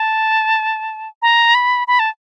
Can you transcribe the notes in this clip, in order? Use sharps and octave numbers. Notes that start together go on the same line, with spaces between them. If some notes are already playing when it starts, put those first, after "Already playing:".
Already playing: A5
A#5
B5
B5
A5